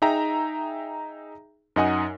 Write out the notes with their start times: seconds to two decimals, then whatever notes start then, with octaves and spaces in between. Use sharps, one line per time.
0.02 D#4 G#4 E5 G5 A#5
1.76 F#2 D#4 D#5 F#5 G#5 D#6